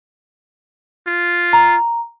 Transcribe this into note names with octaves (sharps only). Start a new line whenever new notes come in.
F4
A#5